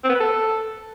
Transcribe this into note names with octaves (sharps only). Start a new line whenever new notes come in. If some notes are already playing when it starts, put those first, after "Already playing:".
C4
B3
B4
A4